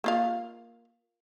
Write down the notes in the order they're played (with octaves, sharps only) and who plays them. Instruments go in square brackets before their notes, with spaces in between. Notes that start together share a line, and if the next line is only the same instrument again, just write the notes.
[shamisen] A#3 F4 F5